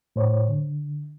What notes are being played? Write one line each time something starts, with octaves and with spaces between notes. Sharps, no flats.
A2 C5 C#5
D3